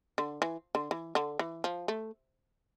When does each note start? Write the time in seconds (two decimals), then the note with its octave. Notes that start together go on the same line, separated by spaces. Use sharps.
0.18 D3
0.42 E3
0.75 D3
0.91 E3
1.15 D3
1.39 E3
1.64 F3
1.88 A3